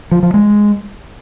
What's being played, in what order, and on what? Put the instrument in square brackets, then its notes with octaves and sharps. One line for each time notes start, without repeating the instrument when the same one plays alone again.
[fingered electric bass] F3
F3
G#3